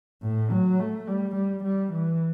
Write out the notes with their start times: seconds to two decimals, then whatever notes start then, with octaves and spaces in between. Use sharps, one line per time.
0.22 A2
0.51 F#3
0.80 A3
1.08 G3
1.36 G3
1.64 G3
1.93 E3